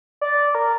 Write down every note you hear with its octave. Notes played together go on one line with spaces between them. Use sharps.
D5
A#4